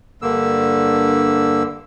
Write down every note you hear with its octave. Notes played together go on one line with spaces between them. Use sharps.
G2 D3 A#3 E6